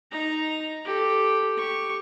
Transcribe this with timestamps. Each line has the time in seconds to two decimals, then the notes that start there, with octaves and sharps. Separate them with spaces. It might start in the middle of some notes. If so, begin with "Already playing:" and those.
0.11 D#4 A#5
0.84 G4 A4
1.57 G4 C#6